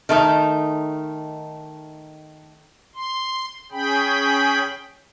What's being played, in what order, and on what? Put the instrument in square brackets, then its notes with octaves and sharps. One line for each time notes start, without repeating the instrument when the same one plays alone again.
[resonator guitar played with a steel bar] D#3 A3 D#4
[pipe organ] C6
C#4 G#4 G5 B5